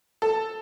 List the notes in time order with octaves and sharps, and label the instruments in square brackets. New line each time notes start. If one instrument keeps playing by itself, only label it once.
[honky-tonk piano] A4